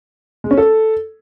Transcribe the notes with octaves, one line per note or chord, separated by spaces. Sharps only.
G#3
C#4
A4